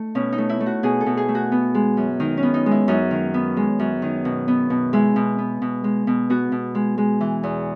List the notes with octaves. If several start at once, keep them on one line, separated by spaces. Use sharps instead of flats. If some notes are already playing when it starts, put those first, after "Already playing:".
Already playing: A3 D#4
B2 C#4
D#4
A3
E4
A3
F#4
B2 G#4
A4
B2
G#4
A3
F#4
B3
G#3
F#2
D#3 D#4
C#4
B3
D#4
G#3
E4
F#2 D#4
D#3
B3
G#3
F#2
D#3
B2
B3
B2
G#3 E4
B2
B3
B2
G#3
B2
B3 F#4
B2
G#3
G#3
E3
E2